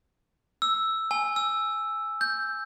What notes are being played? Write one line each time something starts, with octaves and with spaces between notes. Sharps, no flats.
E6
G#5
E6
G6